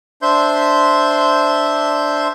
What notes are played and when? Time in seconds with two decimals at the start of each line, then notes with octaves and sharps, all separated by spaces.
0.22 D4 C5 E5 C6 G6